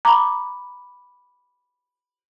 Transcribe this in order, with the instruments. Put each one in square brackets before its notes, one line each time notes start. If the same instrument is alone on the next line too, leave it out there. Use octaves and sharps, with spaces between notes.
[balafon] A#5 [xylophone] B5 D6